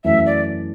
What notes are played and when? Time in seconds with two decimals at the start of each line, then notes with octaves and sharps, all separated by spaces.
0.04 F#2 E3 A3 E5
0.26 D5